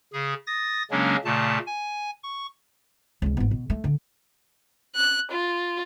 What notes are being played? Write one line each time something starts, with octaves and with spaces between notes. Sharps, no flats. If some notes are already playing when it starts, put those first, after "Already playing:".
C#3 G#4
D#6 A6 A#6
C#3 F#3 G#3 A#3 C#4 D4
A#2 C#3 A3 A5
G#5
C#6
C#2 C3
G#1 B3
B2
A3
D3
F#6
F4